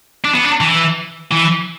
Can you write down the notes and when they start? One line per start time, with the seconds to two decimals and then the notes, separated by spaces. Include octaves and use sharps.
0.24 D4
0.35 B3
0.44 D4
0.61 E3
1.31 E3